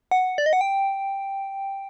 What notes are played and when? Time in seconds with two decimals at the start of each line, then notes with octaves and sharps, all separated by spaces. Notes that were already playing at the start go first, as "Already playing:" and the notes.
0.11 F#5
0.38 D5
0.46 D#5
0.53 F#5
0.61 G5